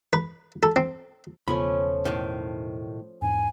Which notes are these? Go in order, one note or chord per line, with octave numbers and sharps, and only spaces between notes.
B4
A4
C4
E1 C#3 F3 A3 B3 C#4 B5
B1 A2 D#3
E2 G#2 G#5